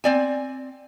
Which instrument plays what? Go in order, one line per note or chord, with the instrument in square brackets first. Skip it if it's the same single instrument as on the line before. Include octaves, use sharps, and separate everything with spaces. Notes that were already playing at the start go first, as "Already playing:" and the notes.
[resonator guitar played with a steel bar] C4 D5 G#5